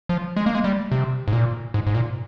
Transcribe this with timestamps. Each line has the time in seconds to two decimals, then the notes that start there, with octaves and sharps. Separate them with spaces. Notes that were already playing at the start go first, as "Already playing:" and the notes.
0.09 F3
0.36 G#3
0.46 A#3
0.55 G#3
0.64 G3
0.92 C3
1.28 G#2
1.33 A#2
1.74 G#2
1.87 G#2
1.95 A#2